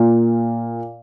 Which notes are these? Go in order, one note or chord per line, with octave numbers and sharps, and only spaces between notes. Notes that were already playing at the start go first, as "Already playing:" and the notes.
Already playing: A#2